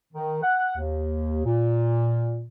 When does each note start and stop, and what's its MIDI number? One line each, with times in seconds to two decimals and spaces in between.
0.13 0.42 51
0.42 0.74 78
0.77 1.41 39
1.44 2.45 46